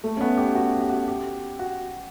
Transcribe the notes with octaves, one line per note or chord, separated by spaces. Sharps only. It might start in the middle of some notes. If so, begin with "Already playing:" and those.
A3
C#4
B3
G4
F#4
G4
F#4
G4
F#4